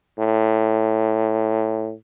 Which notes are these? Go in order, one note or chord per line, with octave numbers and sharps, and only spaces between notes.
A2